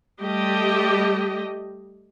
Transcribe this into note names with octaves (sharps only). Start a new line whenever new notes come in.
G3 A3 G4 D#5